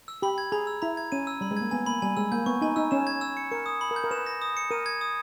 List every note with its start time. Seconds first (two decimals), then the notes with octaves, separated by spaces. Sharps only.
0.08 E6
0.22 G4 B5
0.38 G#6
0.52 G#4 A#5
0.67 E6
0.82 E4 A#5
0.97 G#6
1.12 C#4 D#7
1.27 E6
1.41 G3 B5
1.51 G#3
1.57 A#3 G#6
1.71 B3 G#5
1.86 A#3 B5
2.02 G3 G#5
2.17 G#3 E6
2.32 A#3 G6
2.46 B3 C#6
2.61 D#4 G#5
2.76 D#4 E6
2.91 C#4 E7
3.07 G#6
3.21 E6
3.37 C#7
3.52 A#4 C#7
3.66 D#6
3.81 B5
3.91 A#4
3.96 G6
4.04 A#4
4.11 B4 E7
4.26 A#6
4.42 D#6
4.57 C#7
4.71 A#4 D#7
4.86 G#6
5.01 D#6